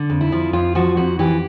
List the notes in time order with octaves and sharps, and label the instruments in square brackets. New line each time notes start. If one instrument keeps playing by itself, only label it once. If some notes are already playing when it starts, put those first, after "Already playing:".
Already playing: [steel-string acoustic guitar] D3
F2
E4
F3
F2 F4
F3 F#4
F2 F#4
E3 G4